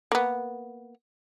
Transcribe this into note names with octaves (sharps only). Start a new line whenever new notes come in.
A#3 B3